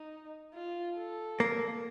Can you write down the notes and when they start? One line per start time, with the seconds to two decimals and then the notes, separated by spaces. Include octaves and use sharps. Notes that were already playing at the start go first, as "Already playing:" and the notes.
Already playing: D#4
0.54 F4
0.97 A4
1.40 A#3